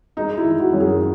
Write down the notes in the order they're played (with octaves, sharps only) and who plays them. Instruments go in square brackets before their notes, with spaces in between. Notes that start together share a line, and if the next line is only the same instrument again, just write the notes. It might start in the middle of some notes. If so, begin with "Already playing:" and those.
[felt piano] G#3 D#4
E4
D#3
F#4
F#2
G#4